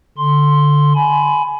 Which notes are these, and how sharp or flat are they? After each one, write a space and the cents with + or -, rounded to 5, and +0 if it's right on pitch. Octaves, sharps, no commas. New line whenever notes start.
D3 +0 C6 +0
G#5 +25 B5 +15